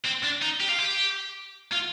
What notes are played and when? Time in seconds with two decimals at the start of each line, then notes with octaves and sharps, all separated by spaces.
0.04 C4
0.23 D4
0.42 D#4
0.61 G4
0.69 F4
0.79 G4
1.73 F4